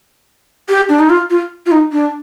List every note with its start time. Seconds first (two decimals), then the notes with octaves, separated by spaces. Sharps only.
0.69 G4
0.89 D4
1.00 D#4
1.10 F4
1.30 F4
1.66 F4
1.72 D#4
1.92 D4